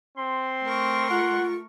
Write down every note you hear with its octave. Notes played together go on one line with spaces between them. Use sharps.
C4 C6
A3 A#4 C#6
F4 F#5